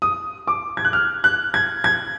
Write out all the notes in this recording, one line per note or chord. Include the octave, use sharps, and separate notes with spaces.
D#6
D6
G#6
F#6
F6
F#6
G#6
G#6